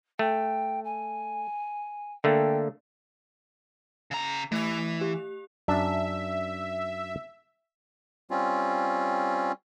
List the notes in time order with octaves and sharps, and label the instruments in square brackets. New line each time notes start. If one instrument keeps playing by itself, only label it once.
[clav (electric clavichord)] A3 [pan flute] G5
[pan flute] G#5
[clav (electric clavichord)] D3 A3 A#3 [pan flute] G5
[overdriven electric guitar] C#3 A#5
[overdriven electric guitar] E3 [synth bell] A3 F7
[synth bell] G4
[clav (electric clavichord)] F#2 D4 [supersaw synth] E5
[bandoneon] G3 C4 C#4 F4